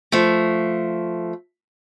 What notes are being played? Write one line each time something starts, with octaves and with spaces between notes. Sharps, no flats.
F3 A3